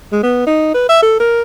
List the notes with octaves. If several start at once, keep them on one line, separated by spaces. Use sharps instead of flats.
G#3
B3
D#4
B4
E5
A4
A#4